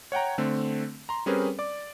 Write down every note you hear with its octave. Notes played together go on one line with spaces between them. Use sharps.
C#5 F#5 G5 A#5
D3 A3 C4
A#5 C6
G3 C4 C#4 G#4 A#4 B4
D5 D6